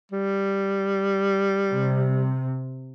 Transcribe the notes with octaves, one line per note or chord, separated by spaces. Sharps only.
G3
C3